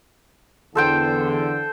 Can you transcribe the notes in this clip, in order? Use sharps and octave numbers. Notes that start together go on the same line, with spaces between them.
E2 D3 A4 C5 G5